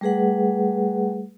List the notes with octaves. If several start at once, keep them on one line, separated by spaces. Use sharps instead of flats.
G3 A3 G#4 B4 F#5